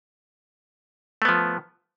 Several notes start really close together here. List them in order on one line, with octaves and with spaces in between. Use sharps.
A3 B3 F3